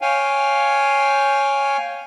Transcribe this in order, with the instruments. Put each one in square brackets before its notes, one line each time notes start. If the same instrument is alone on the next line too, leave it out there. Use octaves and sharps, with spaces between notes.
[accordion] C#5 F5 G5 G#5